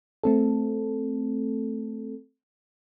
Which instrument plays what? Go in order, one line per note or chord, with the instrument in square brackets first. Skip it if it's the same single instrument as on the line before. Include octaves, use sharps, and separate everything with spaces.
[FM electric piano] A3 C4 A4